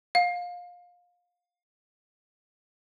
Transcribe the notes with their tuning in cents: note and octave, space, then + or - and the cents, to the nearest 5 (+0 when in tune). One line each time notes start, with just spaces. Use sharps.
F5 +25